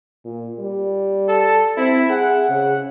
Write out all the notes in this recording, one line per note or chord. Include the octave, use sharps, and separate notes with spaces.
A#2
G3
A4
C4 E4
G#4 F#5
C#3